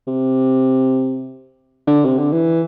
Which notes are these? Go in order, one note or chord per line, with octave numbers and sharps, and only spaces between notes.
C3
D3
C3
D3
E3